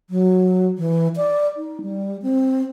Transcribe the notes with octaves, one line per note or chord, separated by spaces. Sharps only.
F#3
E3
D5
D#4
G3
C4